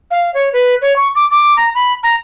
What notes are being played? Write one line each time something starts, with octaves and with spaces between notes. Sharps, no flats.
F5
C#5
B4
C#5
C#6
D6
D6
A#5
B5
A#5